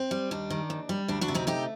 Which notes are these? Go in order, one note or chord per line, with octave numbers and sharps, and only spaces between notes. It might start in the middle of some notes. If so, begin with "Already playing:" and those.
Already playing: C4
G3
D#2 D4
D#3
D#2
G3
D2 D4
D4 F#4
C3
C4 D#4
A3 D#4 G4